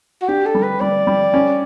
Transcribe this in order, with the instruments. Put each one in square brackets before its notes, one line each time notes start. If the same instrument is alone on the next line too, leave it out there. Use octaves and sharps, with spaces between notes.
[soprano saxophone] F#4
[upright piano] D4 [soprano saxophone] G4
[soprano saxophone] A4
[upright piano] G3
[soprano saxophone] B4
[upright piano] G3 [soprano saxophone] D5
[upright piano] G3
C#4